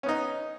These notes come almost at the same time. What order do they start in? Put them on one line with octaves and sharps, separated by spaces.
C#4 B3 D#4